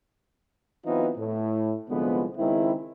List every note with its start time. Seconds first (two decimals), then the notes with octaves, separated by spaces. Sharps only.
0.86 E3 F#3 B3 C4 D#4 F4
1.17 A2
1.90 C2 D3 F3 G#3 B3
2.38 C#2 D#3 G#3 C4 E4